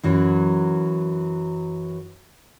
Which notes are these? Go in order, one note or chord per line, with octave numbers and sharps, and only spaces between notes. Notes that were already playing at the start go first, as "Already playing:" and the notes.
F#2 E3 F#3